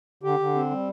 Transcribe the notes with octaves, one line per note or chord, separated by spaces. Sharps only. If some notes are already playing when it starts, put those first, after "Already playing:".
D3 G4
D3
C4
G3